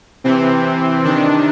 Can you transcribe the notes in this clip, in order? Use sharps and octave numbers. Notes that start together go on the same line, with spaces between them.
C3 E3 C4
C3 D#3 D4